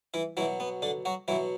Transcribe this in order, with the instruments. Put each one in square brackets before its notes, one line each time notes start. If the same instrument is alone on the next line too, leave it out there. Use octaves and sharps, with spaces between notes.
[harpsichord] E3 E4
B2 E3 F#3 E4
B3
D3 D4
F#3 F#4
B2 E3 F#3 E4